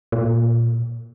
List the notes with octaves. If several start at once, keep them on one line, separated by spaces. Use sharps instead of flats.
A#2